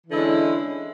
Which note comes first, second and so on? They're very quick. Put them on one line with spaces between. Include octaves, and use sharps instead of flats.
E3 D3 E4 G#3 C#4